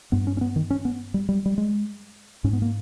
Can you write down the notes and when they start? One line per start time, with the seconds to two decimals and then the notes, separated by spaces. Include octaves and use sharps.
0.12 G2 B3
0.27 C#4
0.37 C#4
0.41 B3
0.56 D#3
0.70 C#4
0.85 B3
1.14 G3
1.29 G3
1.46 G3
1.58 G#3
2.44 G#2 C#4
2.53 B3
2.62 A#3